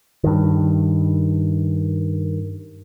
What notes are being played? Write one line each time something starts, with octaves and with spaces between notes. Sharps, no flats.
G2 D#3